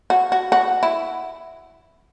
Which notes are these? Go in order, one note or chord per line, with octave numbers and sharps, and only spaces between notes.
F#4
F#4
F#4
E4